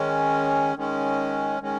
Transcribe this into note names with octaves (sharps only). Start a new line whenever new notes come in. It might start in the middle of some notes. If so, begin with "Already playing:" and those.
Already playing: D#3 G#3 C#4
D#3 G#3 C#4
D#3 G#3 C#4